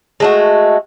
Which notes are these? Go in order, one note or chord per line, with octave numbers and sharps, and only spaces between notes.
G#3 A3 F#4